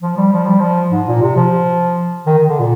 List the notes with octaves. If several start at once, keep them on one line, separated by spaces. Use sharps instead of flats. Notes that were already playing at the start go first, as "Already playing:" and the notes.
F3
G3
F3
G3
F3
G#2
A#2
C3
F3
D#3
D#3
D3
A#2